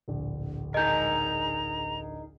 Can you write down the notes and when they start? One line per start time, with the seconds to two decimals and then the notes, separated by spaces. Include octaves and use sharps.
0.08 D1 A#1
0.74 D#4 G#4 A#4 D#5 A#5 G6